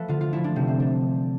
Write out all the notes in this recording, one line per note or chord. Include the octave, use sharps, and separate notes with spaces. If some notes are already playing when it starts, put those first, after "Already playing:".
Already playing: F3 A3 A4 B4
D3 F4
F4
F3 A3 E4
D4
C3 C4
C4
G3 D4